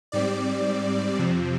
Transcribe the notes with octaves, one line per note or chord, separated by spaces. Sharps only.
G#2 G3 C4 D5
F2 C3 F3 C4